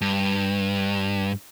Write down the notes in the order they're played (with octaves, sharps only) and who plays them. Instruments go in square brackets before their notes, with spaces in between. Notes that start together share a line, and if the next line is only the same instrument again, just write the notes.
[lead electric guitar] G2